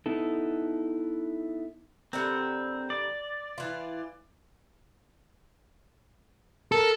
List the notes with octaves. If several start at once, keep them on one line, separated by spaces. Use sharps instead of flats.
B3 D#4 E4 A4
D3 G3 C4 A#4
D5
E3 F4
A4 A#4